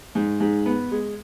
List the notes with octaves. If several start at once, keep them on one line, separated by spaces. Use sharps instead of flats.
G#2
G#2
B3
G#3